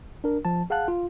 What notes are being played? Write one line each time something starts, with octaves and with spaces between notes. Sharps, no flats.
D4 A#4
F3 A5
G#4 F5 F#5 A5 F#6
F4